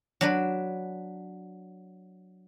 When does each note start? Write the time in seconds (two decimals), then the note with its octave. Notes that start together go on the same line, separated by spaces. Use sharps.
0.21 F#3 D4 B4